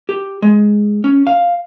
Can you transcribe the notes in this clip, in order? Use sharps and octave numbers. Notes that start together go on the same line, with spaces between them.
G4
G#3
C#4
F5